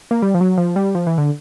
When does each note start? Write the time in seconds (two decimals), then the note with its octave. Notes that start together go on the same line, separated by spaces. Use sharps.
0.11 A#3
0.22 G3
0.34 F3
0.41 F#3
0.58 F3
0.76 G3
0.95 F3
1.07 E3
1.18 D3